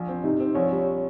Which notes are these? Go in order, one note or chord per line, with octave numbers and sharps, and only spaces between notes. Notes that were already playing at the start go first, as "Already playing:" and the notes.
Already playing: A#1
C4
C3 D#4
C4
A#1 C#5
G3